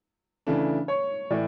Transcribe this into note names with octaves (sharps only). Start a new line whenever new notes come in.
C#3 E3 A3 D4
C#5
A2 E3 D5